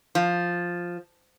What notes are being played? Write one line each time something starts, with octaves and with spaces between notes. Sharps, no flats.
F3